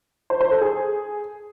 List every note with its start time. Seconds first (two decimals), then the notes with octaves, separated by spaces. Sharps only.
0.30 C5
0.41 C5
0.51 A4
0.61 G#4